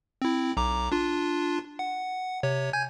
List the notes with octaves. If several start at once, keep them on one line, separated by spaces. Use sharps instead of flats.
C4 E4
B1 A#5 D6
D4 F4
F#5
C3 C#5
G#5 G6 G#6